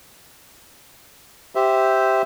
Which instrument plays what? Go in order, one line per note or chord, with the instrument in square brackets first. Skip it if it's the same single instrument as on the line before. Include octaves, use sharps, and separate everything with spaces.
[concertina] G4 C5 E5